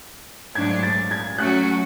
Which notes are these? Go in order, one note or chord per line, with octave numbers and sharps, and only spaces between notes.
G#2 F#3 A3 D4 G#6
A6
G#6
F#3 A3 C#4 F#4 F#6